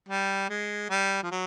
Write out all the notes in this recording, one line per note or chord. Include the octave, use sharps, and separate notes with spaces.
G3
G#3
G3
F3
F#3